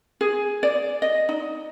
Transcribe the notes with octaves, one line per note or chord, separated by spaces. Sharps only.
G#4
D5
D#5
D#4